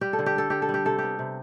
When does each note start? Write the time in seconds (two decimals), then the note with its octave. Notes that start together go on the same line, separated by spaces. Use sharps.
0.01 G3 G4
0.13 A4
0.19 D3
0.26 G4
0.36 D4 A4
0.50 D3 G4
0.62 A4
0.69 G3
0.74 G4
0.85 C3 A4
0.98 B3 G4
1.19 C3